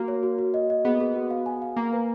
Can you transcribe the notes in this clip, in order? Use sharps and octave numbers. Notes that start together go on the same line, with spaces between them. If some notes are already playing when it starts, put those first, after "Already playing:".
Already playing: A#3 F#4
C#5
F#4
F#4
D#5
D#5
B3 G#4
G#4
F#4
F5
G#5
F5
A#3 A#5
B4